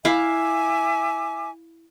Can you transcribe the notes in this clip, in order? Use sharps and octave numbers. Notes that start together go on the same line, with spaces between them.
E4 E5 F5 G#5 D6